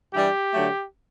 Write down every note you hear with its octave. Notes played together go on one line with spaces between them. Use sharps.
G2 E3 G3 G4
D3 F#3 A3